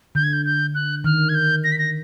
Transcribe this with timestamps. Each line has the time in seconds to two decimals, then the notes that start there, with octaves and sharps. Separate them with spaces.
0.15 D3 G6
0.24 G#6
0.33 G6
0.46 G6
0.75 F#6
1.04 D#3 F6
1.29 G#6
1.35 G6
1.64 A#6
1.72 B6
1.78 A#6